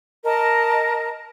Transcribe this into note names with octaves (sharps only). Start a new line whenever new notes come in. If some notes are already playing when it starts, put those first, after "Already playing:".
A#4 D#5 A5